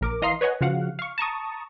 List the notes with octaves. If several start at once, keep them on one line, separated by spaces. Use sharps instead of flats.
A#1 A#4 D6
E3 D#5 F5 A#5 C6 C7
B4 C#5 D#5 F#5 G#5
C#3 F3 F#4 F5 F#5
F5 C#6
A5 A#5 C#6 D#6